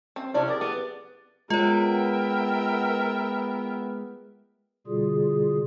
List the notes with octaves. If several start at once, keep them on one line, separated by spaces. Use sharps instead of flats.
C4
C3 C#4 D4 E4 D5
G4 G#4 A#4 D5
B3
G#3 B3 F4 A#4 C#5 E5 G5
B2 D3 G3 F4 G#4